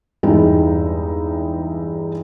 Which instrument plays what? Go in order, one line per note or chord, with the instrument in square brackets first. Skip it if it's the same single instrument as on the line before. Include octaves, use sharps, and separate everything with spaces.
[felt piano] E2 G2 G3 G#3 D#4 E4